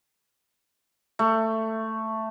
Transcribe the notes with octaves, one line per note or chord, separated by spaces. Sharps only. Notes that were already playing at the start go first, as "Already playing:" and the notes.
A3